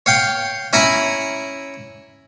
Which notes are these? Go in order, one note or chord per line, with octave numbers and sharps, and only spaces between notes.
C#5 F5 G5
C#4 E4 A#5 B5 C#6